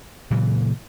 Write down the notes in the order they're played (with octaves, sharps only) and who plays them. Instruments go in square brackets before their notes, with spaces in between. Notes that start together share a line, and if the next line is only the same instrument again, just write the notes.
[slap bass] A#2 C#3 E3 F#3